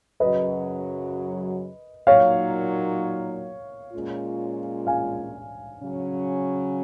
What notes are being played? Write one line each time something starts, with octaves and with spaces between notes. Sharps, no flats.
F#2 C#3 F#3 B4 D#5
A#2 F#3 A#3 D#4 C#5 F5
A#2 G#3 C#4 F4
F5 G#5
C#3 F#3 C#4